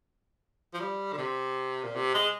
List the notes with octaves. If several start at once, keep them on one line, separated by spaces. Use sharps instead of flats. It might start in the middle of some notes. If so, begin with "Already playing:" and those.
F3
G3
D3
C3
A#2
C3
G#3